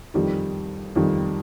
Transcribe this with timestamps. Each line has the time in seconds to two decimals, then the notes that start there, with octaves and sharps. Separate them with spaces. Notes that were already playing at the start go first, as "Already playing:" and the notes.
0.14 F2 D#3 G3
0.96 F2 D#3 G3